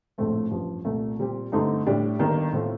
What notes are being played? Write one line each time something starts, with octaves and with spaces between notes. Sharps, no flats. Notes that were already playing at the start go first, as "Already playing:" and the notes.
A#1 A2 A3 C4
A1 G2 F3
C2 A#2 A3
A#2 G3 C4 G4
G2 D3 A3 C4 D#4
A2 G3 D4 G4
G1 G2 D#3 A#3
A2 A3 C4 F4